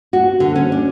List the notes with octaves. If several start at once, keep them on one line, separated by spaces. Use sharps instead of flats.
F#4
D3
C#4
D4